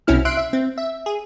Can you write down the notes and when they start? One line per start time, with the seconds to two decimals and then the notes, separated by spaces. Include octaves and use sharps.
0.07 C2 B2 C4 C#4 E4 F6
0.25 E5 C6 F#6 C7 D7
0.37 E5
0.53 C4
0.78 E5
1.06 G#4